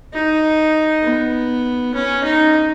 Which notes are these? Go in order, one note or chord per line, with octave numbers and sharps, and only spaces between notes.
D#4
B3
C#4
D#4